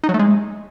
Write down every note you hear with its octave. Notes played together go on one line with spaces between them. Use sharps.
D#4
F#3
A3
G#3